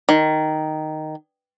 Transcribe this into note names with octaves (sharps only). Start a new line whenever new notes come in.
D#3